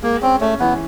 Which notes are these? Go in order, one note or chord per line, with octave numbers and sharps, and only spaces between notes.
G#3 A#3
C4 C#4
A3 C#4
E3 B3